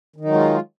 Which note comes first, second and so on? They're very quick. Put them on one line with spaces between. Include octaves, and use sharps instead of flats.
D#3 D#4 F#3 G#3 F4